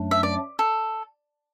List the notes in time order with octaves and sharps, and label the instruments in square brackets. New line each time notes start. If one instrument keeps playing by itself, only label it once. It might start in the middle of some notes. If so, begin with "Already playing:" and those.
Already playing: [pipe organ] F#2 F#3 A3 D4
[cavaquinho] E5
D5
A4